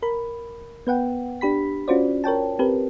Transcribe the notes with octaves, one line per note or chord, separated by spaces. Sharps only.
A#4 B5
B3 B4 F#5 G5
D4 G4 B5 B6
C#4 F4 F#4 C5 D5
A#4 C#5 G5 A5
C4 G4 A#4 B4